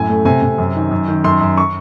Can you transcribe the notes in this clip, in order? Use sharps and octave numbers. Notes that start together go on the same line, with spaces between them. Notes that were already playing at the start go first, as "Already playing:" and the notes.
Already playing: F#2 A2 G#5
A3
C3 G#5
C3
F#2
D#3
F#2
D#3
F#2 C6
F#2
C#6